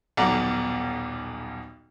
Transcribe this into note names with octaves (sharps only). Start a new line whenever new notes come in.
D#1 B1 B2 D5 F#5 A#5